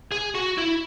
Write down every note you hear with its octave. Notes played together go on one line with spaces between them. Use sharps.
G#4
F#4
E4